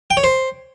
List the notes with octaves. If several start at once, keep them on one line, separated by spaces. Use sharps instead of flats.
G5
C#5
C5